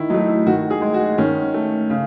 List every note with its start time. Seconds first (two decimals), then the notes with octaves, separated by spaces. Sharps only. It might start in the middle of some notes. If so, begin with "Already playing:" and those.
Already playing: D#3 E4
0.10 F#3 A3 D#4
0.29 E4
0.46 D#3 F#4
0.70 G#4
0.82 G#3
0.94 F#4
1.18 D#3 C#4
1.54 A3
1.90 C#3